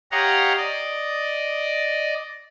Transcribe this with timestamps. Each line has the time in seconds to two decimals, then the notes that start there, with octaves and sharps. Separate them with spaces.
0.12 G4 C#5 D#5 F5 F#5 A#5
0.57 D5 D#5